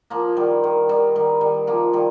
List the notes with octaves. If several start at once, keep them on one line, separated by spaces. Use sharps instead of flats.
F3 A#3
D#3 G3
D#3
D#3 G3
D#3 G3
D#3 G3
F3 A#3
D#3 G3